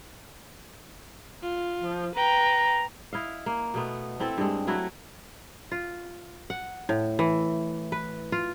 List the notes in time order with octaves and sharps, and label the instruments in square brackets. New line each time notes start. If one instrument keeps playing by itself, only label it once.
[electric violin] F4
[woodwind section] F3
[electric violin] B4 G5 [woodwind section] A#5
[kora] E4 D#5 F5
A#3
B2 A3 B3
A3 C4 E4 A4
G2 G#3
F#3 A3 E4 F#4
F4
F#5
A2
E3
B4
F4